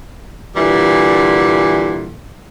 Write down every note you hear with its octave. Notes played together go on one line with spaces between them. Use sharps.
A#2 D3 E3 G3